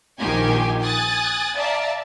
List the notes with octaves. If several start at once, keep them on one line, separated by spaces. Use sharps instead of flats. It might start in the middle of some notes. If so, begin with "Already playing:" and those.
A#1 D#3 F3 G4 G#5
G#5 D#6 F#6 A6
D5 E5 F5 A5 A#5